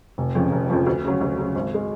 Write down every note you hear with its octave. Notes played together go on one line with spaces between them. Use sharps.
F1
F2 C#3 F3
F1
F2 C#3 F3
D2
C#3 F#3
D2
C#3 F#3
G#1
G#3